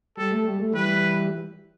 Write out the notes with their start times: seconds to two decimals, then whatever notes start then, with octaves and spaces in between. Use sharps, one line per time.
0.17 G3 A4
0.32 A3
0.45 G3
0.59 A3
0.73 E3 G3 B4